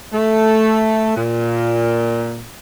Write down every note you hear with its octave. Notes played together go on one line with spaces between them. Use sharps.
A3
A#2